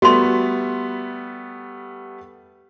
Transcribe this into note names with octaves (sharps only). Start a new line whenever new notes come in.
G3 A3 B3 F#4 C6